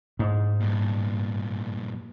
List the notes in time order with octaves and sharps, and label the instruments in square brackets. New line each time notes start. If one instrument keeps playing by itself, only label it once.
[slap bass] G#2
[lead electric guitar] G2 A#2